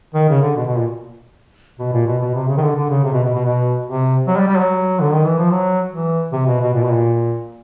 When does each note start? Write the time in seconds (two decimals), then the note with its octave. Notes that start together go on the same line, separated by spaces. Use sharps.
0.14 D#3
0.29 C#3
0.42 D3
0.56 B2
0.67 B2
0.77 A#2
1.79 B2
1.93 A#2
2.07 B2
2.22 B2
2.35 C3
2.48 C#3
2.57 D#3
2.62 D3
2.75 D3
2.90 C#3
3.04 C3
3.13 B2
3.24 B2
3.34 B2
3.45 B2
3.86 C3
4.27 F#3
4.37 G3
4.48 G3
4.58 F#3
5.01 D3
5.13 D#3
5.26 E3
5.39 F3
5.51 F#3
5.92 E3
6.33 C3
6.47 B2
6.61 B2
6.74 A#2
6.84 B2
6.93 A#2